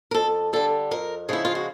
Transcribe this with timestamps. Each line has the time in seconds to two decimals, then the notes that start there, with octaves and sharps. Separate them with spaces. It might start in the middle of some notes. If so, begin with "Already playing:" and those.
0.11 A#4
0.14 F2 A4
0.53 D3 G3 A4
0.91 F2 A#4
1.29 C#3 F3 G#3 E4
1.45 F4
1.55 F#4